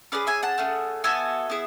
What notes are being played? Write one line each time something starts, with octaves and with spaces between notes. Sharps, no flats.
C#4 G#4 B4 D5
E5 G#5
F#5 A5
A3 C#4 G#4
B3 F#4 A4 E5 G#5
B3 E4 G#4